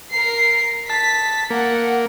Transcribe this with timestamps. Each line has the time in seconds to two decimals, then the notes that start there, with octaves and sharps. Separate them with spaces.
0.11 A#4 C7
0.90 A5 B6
1.50 A#3 F#5